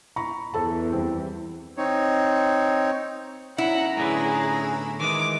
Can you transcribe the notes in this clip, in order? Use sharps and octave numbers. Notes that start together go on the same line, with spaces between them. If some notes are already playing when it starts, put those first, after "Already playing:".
A#5 B5 C#6
E2 A4 A5
E3 G3 C4
C4 D#4 C#5
B1 C#4 E4 F#5 A#5
A2 D3 G#4 B4
D#3 E3 G#3 D6